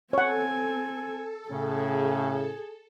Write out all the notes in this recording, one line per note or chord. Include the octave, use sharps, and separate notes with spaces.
C4 A4 C#5 F#5 G#5
A2 C#3 G#4